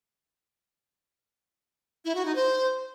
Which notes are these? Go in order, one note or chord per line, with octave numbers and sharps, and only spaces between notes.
E4
F#4
D#4
C5